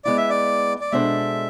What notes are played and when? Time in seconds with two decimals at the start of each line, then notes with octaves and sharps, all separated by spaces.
0.05 G#3 B3 E4 D5
0.18 E5
0.30 D5
0.81 D5
0.92 B2 G#3 D4 A4 C5 E5